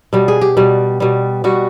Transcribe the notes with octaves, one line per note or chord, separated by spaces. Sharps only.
B2 G3
G#4
G4
B2 G3
B2 G3
B2 G3 F#4